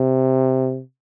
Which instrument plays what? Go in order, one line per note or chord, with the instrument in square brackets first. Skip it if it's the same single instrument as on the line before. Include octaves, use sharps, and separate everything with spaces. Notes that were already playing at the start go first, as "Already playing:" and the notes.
Already playing: [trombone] C3